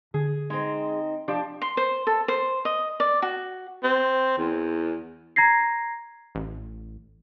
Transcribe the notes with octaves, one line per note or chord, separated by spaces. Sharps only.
D3 G#4
G#3 C4 D#4
F3 D4 G4
C6
C5
A4
C5
D#5
D5
F#4
C4
E2
A#5 G#6 A#6 C7
A1